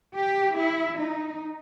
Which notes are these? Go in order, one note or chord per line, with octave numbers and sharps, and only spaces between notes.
G4
E4
D#4